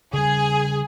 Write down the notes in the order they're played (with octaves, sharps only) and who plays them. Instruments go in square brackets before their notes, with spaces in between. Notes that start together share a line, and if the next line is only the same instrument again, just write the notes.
[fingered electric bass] C#3 G3 [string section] G#4